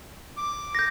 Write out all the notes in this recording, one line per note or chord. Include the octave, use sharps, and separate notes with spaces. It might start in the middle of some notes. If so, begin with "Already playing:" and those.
D6
G6 A#6